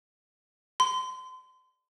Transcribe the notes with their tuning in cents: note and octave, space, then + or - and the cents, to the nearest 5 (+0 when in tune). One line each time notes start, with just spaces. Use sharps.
C6 -35